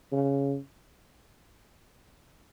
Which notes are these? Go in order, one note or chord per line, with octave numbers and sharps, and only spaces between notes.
C#3